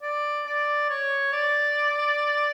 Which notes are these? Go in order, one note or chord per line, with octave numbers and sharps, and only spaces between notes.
D5
D5
C#5
D5